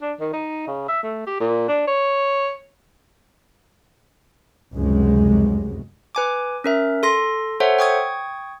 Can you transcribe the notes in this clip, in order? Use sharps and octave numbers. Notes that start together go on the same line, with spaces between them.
D4
D#3
D#4
C#3
E5
A3
G4
A#2
D4
C#5
F1 C#2 F#2 G#3
B4 G#5 D6
C#4 A#4 E5
A4 C6 A#6
A4 C5 C#5 E5 F#5
G5 C#6 D#6 G#6